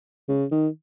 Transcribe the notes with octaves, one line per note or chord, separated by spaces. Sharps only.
C#3
D#3